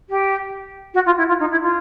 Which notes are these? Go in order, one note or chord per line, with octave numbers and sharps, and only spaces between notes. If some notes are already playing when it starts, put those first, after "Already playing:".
G4
F#4
F4
E4
F4
D#4
E4
F4